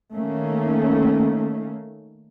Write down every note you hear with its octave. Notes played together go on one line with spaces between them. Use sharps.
D#3 A3 A#3 C#4